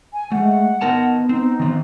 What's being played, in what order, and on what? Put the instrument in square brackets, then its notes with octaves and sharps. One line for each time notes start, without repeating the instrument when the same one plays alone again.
[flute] G#5
[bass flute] G#3 [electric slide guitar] A3 [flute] F#5
[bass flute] B3 [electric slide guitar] D#4 A#4 A5
[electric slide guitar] C4 [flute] D#4
[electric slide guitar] D#3 C4